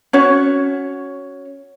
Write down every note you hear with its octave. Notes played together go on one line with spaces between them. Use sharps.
C#4 F#4 C#5